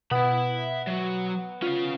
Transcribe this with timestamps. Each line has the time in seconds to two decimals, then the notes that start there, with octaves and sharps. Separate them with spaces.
0.11 B2 B3 E5 B5
0.87 F#3 F#4
1.62 C#4 F4 F5